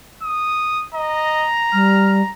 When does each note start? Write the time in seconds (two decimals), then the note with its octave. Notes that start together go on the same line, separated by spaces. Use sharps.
0.23 D#6
0.94 D#5 A#5
1.73 G3 F6